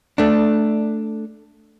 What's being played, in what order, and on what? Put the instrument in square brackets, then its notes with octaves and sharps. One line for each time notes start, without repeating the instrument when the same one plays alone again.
[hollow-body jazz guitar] A3 D4